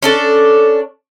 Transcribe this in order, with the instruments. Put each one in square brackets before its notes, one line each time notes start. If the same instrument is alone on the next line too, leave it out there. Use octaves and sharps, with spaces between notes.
[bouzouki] C#4 D4 A4